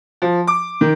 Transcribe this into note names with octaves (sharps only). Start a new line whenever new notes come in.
F3
D6
D#3